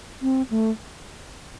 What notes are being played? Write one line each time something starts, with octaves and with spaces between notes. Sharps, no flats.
C4
A3